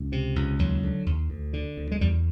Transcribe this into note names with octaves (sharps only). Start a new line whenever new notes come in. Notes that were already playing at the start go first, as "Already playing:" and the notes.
Already playing: C#2
C3
C#2
D#2 F#3
D3
D#2
D2
D3
D2
G#3
E2 G3